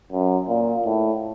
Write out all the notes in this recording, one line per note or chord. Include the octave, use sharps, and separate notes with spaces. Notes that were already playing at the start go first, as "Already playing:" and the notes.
F#2
A#2
A2